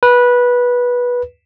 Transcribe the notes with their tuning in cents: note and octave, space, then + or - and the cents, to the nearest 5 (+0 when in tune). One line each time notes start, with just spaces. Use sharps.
B4 -15